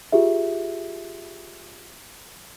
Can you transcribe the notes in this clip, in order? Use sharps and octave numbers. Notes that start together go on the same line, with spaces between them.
F4 G4 G#4 E5